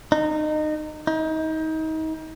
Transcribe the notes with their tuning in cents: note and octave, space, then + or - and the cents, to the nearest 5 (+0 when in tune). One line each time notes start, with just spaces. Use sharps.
D#4 -25
D#4 +30